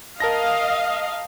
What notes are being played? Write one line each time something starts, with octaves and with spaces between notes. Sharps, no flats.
A#4 D#5 F5 A5 A#6